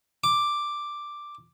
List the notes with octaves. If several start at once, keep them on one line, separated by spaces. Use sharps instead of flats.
D6